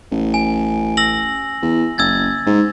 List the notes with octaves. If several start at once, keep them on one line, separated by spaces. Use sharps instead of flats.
A1
G#5
E6 A#6 F#7
E2
F#1 E6 G#6 A6
G#2